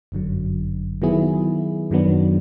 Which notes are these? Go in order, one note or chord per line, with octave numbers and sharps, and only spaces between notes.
G1 F#2 D3 F#3
D#3 F#3 B3 E4 G#4
F#2 D#3 F#3 B3 D4